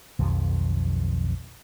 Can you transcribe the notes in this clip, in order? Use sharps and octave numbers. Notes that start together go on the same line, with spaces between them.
B1 F2 D#3 F3